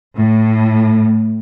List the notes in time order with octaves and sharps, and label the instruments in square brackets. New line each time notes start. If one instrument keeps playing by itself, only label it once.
[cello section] A2